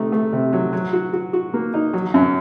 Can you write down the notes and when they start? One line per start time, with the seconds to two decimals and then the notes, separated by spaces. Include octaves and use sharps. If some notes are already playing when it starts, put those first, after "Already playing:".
Already playing: C3 A3 D#4
0.12 A3
0.33 C3
0.53 F#3
0.73 F#3
0.93 F#4
1.13 F#4
1.33 F#4
1.54 A#3
1.74 D#4
1.93 F#3
2.14 F#2